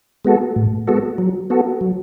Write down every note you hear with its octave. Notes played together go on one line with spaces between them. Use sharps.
G#3 B3 F#4 A4
A2
G#3 B3 F#4 A4
F#3
B3 F#4 A4
F#3